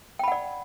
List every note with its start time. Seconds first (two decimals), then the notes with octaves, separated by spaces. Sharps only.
0.19 G5
0.24 B5
0.28 F#5
0.32 D5